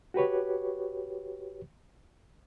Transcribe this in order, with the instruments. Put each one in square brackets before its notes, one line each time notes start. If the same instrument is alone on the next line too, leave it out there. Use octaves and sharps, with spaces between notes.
[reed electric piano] F#4 G4 B4 C#5